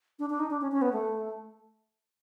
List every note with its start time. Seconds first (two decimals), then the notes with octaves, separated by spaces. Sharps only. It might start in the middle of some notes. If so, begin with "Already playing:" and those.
0.19 D4
0.30 D4
0.39 D#4
0.50 D4
0.61 C#4
0.72 C#4
0.82 B3
0.93 A3